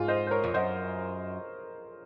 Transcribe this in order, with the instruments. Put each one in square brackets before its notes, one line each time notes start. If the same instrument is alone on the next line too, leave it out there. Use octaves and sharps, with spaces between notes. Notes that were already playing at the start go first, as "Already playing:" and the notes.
Already playing: [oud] G#2 [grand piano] F4 G#4
[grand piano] C5 D#5
C5
A#4 C#5
[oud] F2
[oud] F#2 [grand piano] C5 D#5